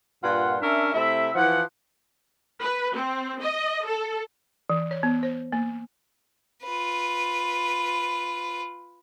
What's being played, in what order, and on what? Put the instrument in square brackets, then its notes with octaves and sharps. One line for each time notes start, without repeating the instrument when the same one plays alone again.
[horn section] G2 A#2 F4 F#5
C#4 D4 A#4 E5
C3 A3 E4 E5
E3 F3 F#5
[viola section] B4
C4
D#5
A4
[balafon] E3
C#5
B3
C5
A#3
[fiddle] F4 B4